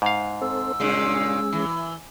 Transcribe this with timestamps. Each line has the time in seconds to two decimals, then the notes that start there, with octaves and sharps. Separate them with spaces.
0.02 G#2 F5
0.42 C4 A4 C5 E6
0.80 G2 A#2 C#3 G#3 C#4 G#4
1.53 E3